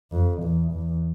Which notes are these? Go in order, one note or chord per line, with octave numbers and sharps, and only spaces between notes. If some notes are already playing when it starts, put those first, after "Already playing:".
F2
E2
E2